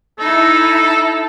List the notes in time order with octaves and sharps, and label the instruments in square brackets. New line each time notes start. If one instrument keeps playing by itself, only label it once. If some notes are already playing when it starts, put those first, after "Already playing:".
[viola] D#4 E4 [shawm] A4